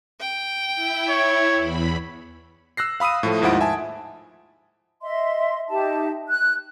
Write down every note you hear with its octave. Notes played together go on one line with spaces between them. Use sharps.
G5
E4
C#5
E2 B5
E6 F#6 A#6 C7
F5 B5 D#6 E6 D#7
A2 F3 A3
D#2 G#2 F3 E4 F#5 D7
E5 G#5 A5
D#5 E5 C6
D#4 G4 E5 A5
F#6